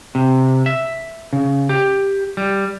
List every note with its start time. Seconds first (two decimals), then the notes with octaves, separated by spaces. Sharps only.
0.15 C3
0.66 E5
1.33 C#3
1.69 G4
2.37 G3